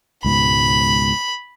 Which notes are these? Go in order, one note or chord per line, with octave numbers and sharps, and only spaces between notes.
C#2 G#2 B2 B5